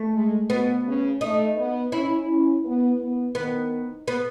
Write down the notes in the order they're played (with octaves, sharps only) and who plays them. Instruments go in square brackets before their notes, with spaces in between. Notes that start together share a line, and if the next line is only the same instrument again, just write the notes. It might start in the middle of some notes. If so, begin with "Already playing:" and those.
Already playing: [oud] A3
[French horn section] G#3
[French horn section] B2 [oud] B3
[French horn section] C#3
[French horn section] A3 [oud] D#4
[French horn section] B3
[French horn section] C#4 [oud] E4
[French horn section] C#4
B3
B3
[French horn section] D#3 [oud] B3
[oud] B3